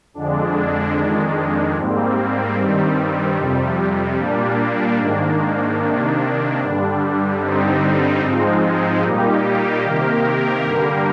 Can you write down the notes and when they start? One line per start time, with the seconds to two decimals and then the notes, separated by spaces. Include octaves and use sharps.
0.14 F2 D3 G#3 D4
0.95 F2 D#3 G#3
1.76 G#2 G3 A#3 C4
2.57 G2 D#3 G3
3.37 F2 C3 G3
4.18 A#2 G3 A#3 D4
4.99 G#2 D#3 A#3
5.79 C3 D#3 A#3 D4
6.60 G2 D3 G3
7.41 G2 D3 G3 C4 D#4
8.22 G#2 F3 G#3
9.02 A#2 G3 A#3 D#4 G4
9.83 C3 D#3 A#3 G4 A#4
10.63 G2 D3 G3 A#3